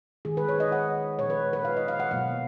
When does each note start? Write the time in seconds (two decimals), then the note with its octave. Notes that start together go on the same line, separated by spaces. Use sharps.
0.25 D#3 G#3 G#4
0.37 B4
0.49 C#5
0.60 D#5
0.72 F#5
1.18 A#2 F3 G#3 C#5
1.30 B4
1.53 B4
1.65 F5
1.77 D#5
1.88 F5
2.00 F#5
2.11 B2 F#3 A#3 F5